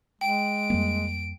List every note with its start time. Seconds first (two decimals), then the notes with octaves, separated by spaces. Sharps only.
0.21 G#3 G5 D7
0.70 F2 G3 A#3